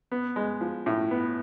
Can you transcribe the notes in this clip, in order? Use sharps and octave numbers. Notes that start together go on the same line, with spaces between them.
B3
G#3
F3
A2
B3